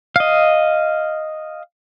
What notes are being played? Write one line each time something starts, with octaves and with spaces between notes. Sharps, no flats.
D#5 F5